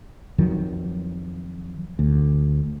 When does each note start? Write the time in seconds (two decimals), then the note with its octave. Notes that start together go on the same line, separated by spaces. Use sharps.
0.38 F2 D#3 F#3
1.99 D2